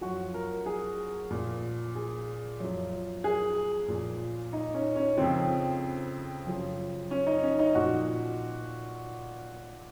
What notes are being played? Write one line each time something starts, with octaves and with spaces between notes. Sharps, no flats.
F#2 F3 F#4
A#4
G#4
A#2 F3
G#4
F#2 F3
G#4
A#2 F3
D#4
C#4
C#4
F2 C#3 F3 C4
F#2 C#3 F3
C#4
D#4
C#4
D#4
A#2 F3 F#4